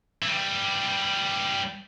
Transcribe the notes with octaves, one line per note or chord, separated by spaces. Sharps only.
E3 G3